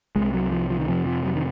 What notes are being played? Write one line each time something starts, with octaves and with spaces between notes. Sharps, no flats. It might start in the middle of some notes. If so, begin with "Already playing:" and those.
C2 C3 G#3
F#3
F3
F3
D#3
F2 C3 F3
F3
F#3
D#3